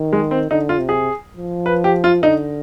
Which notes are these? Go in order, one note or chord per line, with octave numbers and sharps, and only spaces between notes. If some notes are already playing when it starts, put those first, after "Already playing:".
Already playing: D#3
G#3
C4
D3 D#4
F4
C3
G#4
F3
B4
G4
F4
D3 D#4